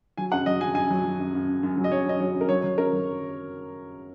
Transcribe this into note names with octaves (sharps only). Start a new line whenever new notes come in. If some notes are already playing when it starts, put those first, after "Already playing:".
F#3 G#5
F#2 F#5
F#3 D#5
F#2 G#5
F#2 G#5
F#3
F#3
F#2
F#2
F#2
F#2
F#3
D#5
F#2 C#5
F#2 D#5
F#3 C#5
F#2
A#4
F#3 C#5
F#3
F#2 A#4
F#3